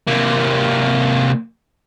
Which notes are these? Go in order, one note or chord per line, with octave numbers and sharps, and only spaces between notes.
C3 A#3